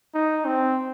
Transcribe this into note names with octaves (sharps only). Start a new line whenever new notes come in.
D#4
C4